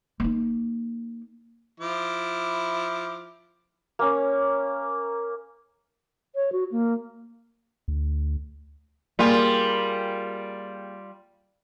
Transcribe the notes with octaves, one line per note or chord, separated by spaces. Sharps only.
A#3 D#4
F3 E4 D6
A#3 C#4
C#5
F#4
A#3
D2
G3 A#3 F4 G#4